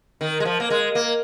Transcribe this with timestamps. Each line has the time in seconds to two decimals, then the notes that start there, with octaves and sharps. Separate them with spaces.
0.21 D#3
0.40 G#3
0.45 F3
0.60 A#3
0.70 G#3
0.95 A#3